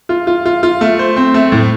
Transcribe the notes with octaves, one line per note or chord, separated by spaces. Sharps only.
F4
F4
F4
F4
A3
C5
C4
A3
A2